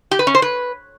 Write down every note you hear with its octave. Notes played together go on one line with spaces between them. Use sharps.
G4
B4
C#4
C5
B4